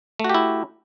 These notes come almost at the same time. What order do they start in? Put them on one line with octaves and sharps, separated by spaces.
A3 F#4 G4 E4